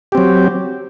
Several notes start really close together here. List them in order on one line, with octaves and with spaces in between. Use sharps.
G4 C4 F#3